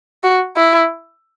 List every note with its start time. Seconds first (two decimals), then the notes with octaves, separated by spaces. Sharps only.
0.23 F#4
0.56 E4